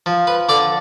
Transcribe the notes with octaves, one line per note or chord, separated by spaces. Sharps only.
F3
B4
D3 D5